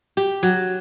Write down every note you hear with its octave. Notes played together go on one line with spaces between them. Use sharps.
G4
F#3